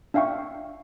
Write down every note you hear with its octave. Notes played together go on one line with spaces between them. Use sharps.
D4 E5 F5 G5 C#6